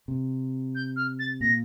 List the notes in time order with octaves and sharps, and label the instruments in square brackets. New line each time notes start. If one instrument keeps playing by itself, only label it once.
[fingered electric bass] C3
[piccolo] G6
F6
A6
[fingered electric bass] A#2 [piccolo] A#6